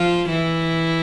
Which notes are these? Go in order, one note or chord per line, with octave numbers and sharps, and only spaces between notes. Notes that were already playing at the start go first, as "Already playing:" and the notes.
Already playing: F3 F4
E3 E4